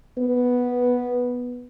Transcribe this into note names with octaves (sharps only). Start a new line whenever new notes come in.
B3